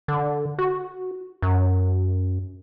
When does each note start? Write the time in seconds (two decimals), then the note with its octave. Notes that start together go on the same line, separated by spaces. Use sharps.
0.08 D3
0.59 F#4
1.42 F#2